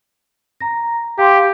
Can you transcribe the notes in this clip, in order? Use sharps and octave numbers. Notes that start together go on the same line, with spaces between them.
A#5 A#6
G4 F5 C6